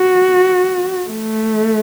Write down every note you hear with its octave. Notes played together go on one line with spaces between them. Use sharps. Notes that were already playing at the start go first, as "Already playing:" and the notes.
Already playing: F#4
A3